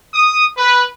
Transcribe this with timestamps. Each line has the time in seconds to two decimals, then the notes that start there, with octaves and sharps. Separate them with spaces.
0.14 D#6
0.57 B4